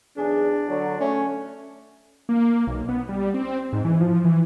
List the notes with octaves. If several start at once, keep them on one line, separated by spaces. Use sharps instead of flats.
B1 E2 D4 G#4
D3 F#3
A3 C#4
A#3
B1
B3
G3
C4
G#2
E3
F3
E3